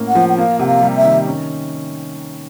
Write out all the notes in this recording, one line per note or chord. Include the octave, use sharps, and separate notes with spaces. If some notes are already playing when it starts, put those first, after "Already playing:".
Already playing: A2 A#3 C#4
F#5
F3
F#5
A#3 F5
C3 F#5
F5
G3
E5
D#3
C#4